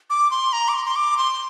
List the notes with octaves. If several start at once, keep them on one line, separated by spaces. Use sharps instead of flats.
D6
C6
A#5
D6
C6
C6
D6
C6